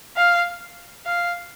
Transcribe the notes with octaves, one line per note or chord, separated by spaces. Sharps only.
F5
F5